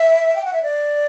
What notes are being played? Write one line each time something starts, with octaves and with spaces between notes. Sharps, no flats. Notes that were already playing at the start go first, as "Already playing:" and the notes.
Already playing: E5
G5
F#5
E5
D5